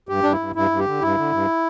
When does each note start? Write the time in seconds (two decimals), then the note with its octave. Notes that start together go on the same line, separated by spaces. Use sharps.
0.09 G2 G4
0.23 G2 D4
0.32 E4
0.40 G2
0.55 G2 E4
0.71 G2
0.79 G4
0.86 D3
1.01 G2 E4
1.17 D3
1.32 G2